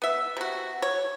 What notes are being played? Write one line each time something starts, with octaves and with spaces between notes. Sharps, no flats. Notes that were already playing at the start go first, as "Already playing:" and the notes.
B3 E5
C3 F#4
C#5